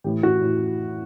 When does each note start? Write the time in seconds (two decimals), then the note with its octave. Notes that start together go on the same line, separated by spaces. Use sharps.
0.04 A2 E3 G4
0.23 F#4
0.41 A2